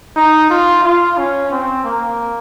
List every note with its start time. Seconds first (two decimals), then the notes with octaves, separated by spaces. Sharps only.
0.16 D#4
0.50 F4
0.84 F4
1.17 C#4
1.51 C4
1.84 A#3